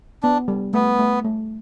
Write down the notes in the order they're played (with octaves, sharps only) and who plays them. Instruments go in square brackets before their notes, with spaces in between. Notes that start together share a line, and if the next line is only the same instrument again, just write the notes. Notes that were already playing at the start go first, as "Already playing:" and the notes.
[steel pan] B3 [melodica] D4
[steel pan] G3
[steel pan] A3 [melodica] B3
[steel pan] A3
A3